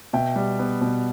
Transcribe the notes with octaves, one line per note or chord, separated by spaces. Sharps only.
B2 E5 G5
G3
B3
B2